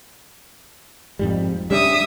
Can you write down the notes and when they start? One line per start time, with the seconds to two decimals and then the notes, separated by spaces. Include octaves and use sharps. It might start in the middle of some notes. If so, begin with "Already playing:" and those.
1.19 F2 G#2 G3
1.71 G3 C#4 D4 E5 D#6